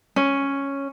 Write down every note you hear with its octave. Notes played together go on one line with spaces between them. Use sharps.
C#4